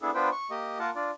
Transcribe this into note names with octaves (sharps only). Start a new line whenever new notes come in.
B3 D4 E4 G#4 A4
B3 D4 F4 B4 C5 G5
C#6
A#3 G4 D#5
A#3 F4 A#4 F#5 A5
D4 F4 D5